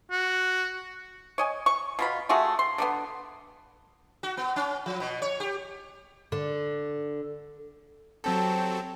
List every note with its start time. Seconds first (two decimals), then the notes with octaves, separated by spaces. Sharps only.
0.11 F#4
1.38 C#5 D#5 G#5
1.66 C#6
1.99 B2 F4 B5
2.29 A3 F4 F#4 G#4
2.59 C6
2.78 D3 A#3 B3
4.23 F#4
4.37 B3
4.56 C#4
4.86 F3
5.00 B2
5.22 C#5
5.40 G4
6.32 D3
8.24 F#3 C4 G4 A4 A5